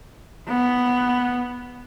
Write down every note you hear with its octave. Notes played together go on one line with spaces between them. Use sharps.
B3